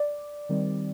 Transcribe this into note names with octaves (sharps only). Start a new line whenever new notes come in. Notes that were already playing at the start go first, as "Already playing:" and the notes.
Already playing: D5
D#3 G3 C4